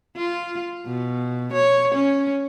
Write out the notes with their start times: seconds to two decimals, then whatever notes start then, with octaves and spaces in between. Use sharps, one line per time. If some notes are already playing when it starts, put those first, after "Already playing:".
0.17 F4
0.87 B2
1.53 C#5
1.95 C#4